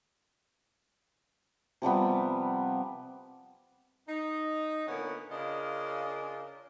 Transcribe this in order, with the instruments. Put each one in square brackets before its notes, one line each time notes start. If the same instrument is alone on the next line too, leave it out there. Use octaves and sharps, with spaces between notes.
[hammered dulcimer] C3 F3 G3 B3
[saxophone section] D#4
A#2 D3 B3 C#4 A#4 F#5
C#3 C#4 D4 F4 A#4 D#5